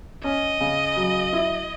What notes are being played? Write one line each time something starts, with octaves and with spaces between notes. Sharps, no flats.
C#4 D#5
C#3
F#3
E4